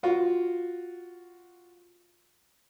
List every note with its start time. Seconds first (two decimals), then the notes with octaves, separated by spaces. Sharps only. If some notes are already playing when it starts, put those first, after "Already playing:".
0.03 F4 F#4